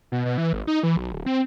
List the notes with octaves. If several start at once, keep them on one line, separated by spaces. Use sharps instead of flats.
B2
B2
E3
G#1
D#4
E3
B1
D1
C4